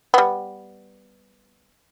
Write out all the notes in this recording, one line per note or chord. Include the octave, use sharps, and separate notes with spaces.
G3 B3